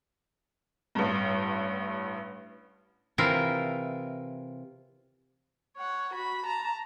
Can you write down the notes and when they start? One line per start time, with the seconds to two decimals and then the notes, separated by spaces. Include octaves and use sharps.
0.95 A1 G2
3.18 C3 E3 E4 F4 A#4
5.77 C#5 F#5
6.14 F#4 B5
6.46 A5 A#5